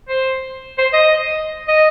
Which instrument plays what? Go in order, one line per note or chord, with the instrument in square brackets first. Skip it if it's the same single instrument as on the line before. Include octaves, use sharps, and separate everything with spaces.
[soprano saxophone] C5
C5
D#5
D#5